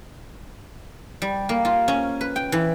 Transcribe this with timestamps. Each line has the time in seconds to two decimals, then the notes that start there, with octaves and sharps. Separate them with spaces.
1.22 G3
1.49 A#3
1.65 F4
1.88 C#4
2.21 B4
2.36 G5
2.52 E3